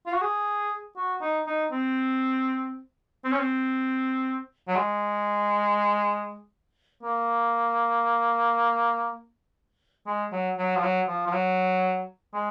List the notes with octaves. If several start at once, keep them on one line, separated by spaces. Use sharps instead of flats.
F4
F#4
G#4
F#4
D#4
D#4
C4
C4
C#4
C4
F#3
G#3
A#3
G#3
F#3
F#3
F3
F#3
F3
F3
F#3
G#3